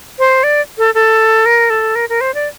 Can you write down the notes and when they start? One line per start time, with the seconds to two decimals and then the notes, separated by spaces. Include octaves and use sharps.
0.19 C5
0.44 D5
0.78 A4
0.95 A4
1.46 A#4
1.70 A4
1.95 A#4
2.09 A#4
2.21 C5
2.34 D5